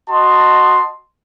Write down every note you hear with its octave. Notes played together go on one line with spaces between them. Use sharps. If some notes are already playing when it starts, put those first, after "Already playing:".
F#4 D#5 A5 C6